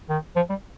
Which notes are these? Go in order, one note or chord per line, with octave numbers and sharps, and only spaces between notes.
D#3
F3
G3